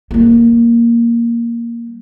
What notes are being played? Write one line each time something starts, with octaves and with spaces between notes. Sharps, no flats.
G3 A#3